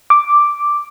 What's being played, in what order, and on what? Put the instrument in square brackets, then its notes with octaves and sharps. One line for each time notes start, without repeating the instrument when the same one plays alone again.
[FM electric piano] D6